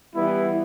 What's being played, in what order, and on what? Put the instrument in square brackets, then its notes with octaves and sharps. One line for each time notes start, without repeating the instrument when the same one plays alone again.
[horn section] E3 G3 B3 E4